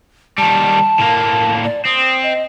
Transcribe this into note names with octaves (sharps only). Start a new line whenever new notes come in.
D#3 G3 A5
A2 A#3
D5
C4 D#6
D#5